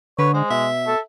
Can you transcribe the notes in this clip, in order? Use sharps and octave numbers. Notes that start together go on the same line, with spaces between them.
D3 B4 C#5
G#3 C5
B2 E5
A4